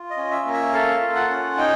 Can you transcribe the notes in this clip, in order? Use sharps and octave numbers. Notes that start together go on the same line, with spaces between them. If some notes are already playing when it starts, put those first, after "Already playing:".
Already playing: F4
D#5
C#4
E5
A#3
E5
A4 F5
F4
F#5
C#4
D#4 G5